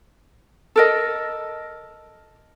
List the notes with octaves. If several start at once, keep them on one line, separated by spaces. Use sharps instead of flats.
A4 A#4 D#5